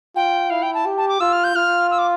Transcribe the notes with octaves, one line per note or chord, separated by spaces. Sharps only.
F4 G5
E4 F5
G5
A5
G4
A5
D6
F4 E6
F6
G6
F4 F6
E6
D6